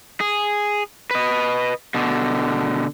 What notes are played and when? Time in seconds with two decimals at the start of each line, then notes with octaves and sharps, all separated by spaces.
0.20 G#4
1.11 B4 D#5
1.94 B2 D3